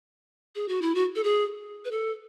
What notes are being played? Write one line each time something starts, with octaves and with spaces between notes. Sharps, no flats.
G#4
F#4
E4
F#4
A4
G#4
B4
A4